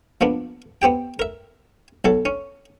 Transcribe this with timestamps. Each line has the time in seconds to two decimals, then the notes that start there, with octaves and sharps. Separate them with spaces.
0.21 F3 A#3 B3 D4
0.82 B3 C4 G4 G5
1.19 A#4 E5
2.05 B1 F#3 A4
2.25 C#4